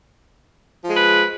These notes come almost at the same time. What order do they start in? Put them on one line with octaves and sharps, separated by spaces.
F3 G#3 B4